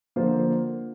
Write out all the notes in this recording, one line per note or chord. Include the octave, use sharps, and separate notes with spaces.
D3 F3 A#3 F4 C5